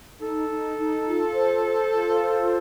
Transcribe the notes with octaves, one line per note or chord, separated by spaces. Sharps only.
D#4 A4
D#4
D#4
F4
C5
C5
F4
C5